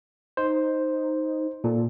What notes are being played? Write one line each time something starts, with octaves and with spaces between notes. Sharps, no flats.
D#4 C5
A#2 A4